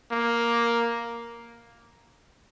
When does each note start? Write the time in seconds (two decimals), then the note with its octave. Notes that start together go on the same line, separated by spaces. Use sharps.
0.12 A#3